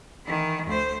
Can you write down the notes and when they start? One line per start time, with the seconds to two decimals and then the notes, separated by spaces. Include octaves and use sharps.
0.25 D#3 E3
0.67 D2 C5